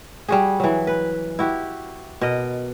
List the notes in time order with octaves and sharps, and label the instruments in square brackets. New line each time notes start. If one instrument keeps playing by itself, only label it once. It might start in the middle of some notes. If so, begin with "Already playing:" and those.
[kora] G3 F#4 G#4
E3 F#3
B4
E4 F#4 G4
B2 A#4 D#5